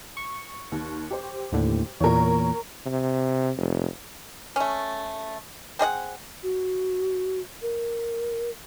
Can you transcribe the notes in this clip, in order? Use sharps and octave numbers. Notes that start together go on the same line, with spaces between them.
C#6
D#2
G4 C5
D#2 A2 D3
E2 A#2 A#4 C#5
C3
F1
A3 C#4
C4 G#4 D#5 F#5
F#4
A#4